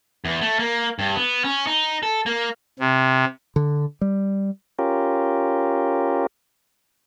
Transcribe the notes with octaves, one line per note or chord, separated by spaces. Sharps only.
E2
A3
A#3
G2
B3
C#4
D#4
A4
A#3
C3
D3
G3
C#4 F4 G4 A#4